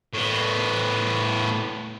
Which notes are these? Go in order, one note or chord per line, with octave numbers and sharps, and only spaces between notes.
A2 B3